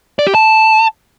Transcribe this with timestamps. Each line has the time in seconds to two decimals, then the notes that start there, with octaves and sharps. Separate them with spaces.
0.19 D5
0.27 G4
0.35 A5